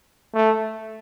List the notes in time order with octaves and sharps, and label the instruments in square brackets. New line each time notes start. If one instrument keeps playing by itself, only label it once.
[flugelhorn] A3